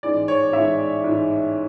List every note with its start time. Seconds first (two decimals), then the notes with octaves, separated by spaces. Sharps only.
0.03 A1 G#2 G#3 D5
0.28 C#5
0.53 A1 G#2 G#3 E5
1.04 A1 G#2 G#3